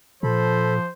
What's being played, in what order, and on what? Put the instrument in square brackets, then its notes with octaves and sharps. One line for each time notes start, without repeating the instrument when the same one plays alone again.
[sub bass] A#2 [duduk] F3 [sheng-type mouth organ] A4 B5 [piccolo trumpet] C5